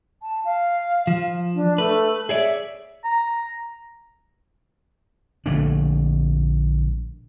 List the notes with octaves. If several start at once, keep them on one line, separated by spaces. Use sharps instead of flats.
A5
F5
F3
D4
A3 B4
G#4 C#5 D5 E5
A#5
A#1 D3 A3 D4